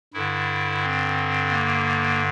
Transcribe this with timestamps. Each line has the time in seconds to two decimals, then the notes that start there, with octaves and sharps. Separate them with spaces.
0.13 G2 D3 E4
0.83 C4
1.50 A#3